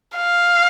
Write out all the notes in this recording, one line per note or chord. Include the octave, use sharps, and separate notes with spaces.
F5